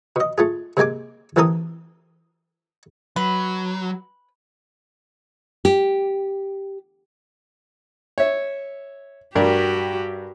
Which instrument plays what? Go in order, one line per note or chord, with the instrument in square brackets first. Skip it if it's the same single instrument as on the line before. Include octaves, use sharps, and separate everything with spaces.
[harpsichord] B2 D#5
A3 F4 G#4
C3 G#3 A#3 G#5 D6
A1 E3 C4 A4 A#4 D#6
[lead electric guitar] F#3 [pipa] B4
[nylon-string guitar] G4
[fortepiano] C#5 E5
[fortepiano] G2 A#4 D5 [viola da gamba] F#4 G4